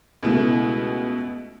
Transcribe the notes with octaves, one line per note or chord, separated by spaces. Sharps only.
C#2 B2 A3 E4